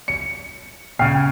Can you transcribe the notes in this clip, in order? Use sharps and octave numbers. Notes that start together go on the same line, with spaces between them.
C#7
A#2 C#3 G5 F6 C7